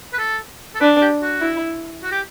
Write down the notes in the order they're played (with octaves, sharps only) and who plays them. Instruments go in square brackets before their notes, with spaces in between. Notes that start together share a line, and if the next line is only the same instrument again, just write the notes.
[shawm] B4
A4
A4
[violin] D4 [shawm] B4
[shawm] G4
F#4
[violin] E4
[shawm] F#4
G4